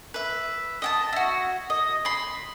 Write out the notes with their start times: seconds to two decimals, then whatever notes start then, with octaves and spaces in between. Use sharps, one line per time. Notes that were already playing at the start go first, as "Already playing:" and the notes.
0.14 B4 E5
0.82 D#5 G5 A5
1.13 E4 F#4
1.70 D#5
2.05 B5 C6